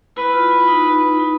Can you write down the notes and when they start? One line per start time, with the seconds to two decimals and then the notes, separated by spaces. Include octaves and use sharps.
0.17 E4 B4
0.34 F4
0.51 E4
0.68 D#4
1.20 D#4